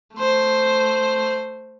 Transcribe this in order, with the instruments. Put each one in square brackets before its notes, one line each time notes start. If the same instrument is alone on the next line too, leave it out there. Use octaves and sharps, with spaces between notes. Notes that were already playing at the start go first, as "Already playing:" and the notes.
[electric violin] A3 C5